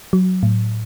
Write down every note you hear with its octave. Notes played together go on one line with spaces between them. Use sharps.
F#3
A2